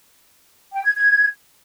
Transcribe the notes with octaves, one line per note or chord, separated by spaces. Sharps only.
G5
G#6
G#6